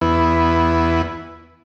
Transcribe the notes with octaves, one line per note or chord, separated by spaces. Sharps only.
E2 B3 E4